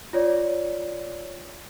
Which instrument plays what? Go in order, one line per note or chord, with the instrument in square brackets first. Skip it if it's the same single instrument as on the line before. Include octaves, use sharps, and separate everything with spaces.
[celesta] F4 C#5 D5